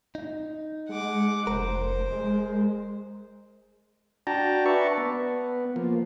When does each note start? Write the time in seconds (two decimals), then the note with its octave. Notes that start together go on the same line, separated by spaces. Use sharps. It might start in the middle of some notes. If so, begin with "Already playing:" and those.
0.15 D#4
0.89 G#3 F#5 D6
1.47 F1 A#4 C5
2.09 G#3
4.27 D4 F#4 G5 A5 A#5
4.66 B4 D5 E5 A5 C#6
4.97 B3
5.76 F3 A#3